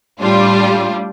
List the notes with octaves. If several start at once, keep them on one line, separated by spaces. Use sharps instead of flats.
A2 G3 D4 F4